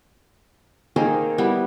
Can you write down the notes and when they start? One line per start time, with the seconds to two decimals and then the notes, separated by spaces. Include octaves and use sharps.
0.96 D#3 A#3 C4 D#4 G#4 A#4
1.38 G3 B3 E4